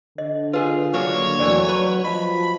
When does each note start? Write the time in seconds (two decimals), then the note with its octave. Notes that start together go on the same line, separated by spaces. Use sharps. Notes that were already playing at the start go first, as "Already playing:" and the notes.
0.18 D3 D#5
0.53 F4 G#4 B4
0.94 D3 F#3 A#3 D4 C#5
1.40 F2 E3 F#3 A3 D5
1.69 B4
2.04 F3 D#5 A5 B5